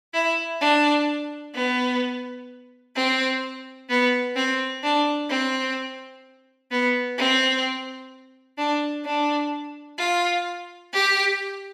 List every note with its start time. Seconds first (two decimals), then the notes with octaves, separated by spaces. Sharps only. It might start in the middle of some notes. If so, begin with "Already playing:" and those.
0.14 E4
0.61 D4
1.55 B3
2.96 C4
3.89 B3
4.36 C4
4.83 D4
5.30 C4
6.71 B3
7.18 C4
8.58 D4
9.05 D4
9.98 F4
10.93 G4